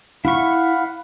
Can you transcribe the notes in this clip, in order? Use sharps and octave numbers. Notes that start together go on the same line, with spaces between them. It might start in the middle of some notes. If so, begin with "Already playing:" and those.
E4 F5 F#5 B5 C#6